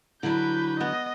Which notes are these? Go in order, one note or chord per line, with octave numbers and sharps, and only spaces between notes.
D3 F#3 E4 B4 G6
B3 D#5